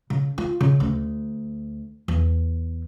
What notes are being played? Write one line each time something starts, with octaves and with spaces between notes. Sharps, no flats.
C#3
F4
C#3
D2
E2